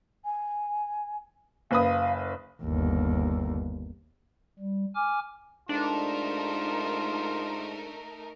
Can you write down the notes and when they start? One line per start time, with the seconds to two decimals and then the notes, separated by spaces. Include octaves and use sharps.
0.24 G#5
1.71 F#1 B4 F5 D#6
2.63 G1 D#2
4.59 G3
4.95 G#5 D6 F6
5.69 G#2 A3 D4 D#4 F4 A#4